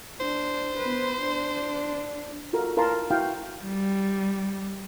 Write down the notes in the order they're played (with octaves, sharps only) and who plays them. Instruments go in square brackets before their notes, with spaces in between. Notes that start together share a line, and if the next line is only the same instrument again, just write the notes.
[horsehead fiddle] D4 [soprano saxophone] C5
[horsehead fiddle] B3 B4
D4
[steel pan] F4 F#4 A4 A#4
E4 A#4 F5 A5 C6
E4 F#4 F5 G5
[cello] G3